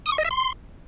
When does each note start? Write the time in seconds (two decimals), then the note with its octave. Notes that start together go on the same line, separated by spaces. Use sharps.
0.06 D#6
0.12 C#6
0.18 D#5
0.24 E5
0.31 C6